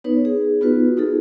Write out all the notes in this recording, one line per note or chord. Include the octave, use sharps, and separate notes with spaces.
B3 D#4 B4 C#5
G#4
B3 D#4 F4 F#4 B4
D#4 F4 G#4 A4